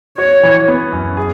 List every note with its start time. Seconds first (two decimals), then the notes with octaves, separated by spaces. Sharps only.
0.18 F#4 C#5
0.43 E3
0.68 B3
0.92 F#2
1.17 G#4